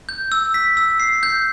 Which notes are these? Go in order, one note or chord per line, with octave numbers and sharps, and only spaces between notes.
G6
E6
B6
E6
C7
G6